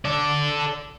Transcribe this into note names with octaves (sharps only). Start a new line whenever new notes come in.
A4 D5